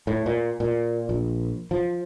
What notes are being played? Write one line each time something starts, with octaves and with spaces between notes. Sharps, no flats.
A2
A#2
A#2
A#1
F3